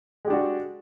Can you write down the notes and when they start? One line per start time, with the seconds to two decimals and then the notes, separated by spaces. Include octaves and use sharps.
0.25 G#3
0.27 G4
0.30 D4
0.33 F#4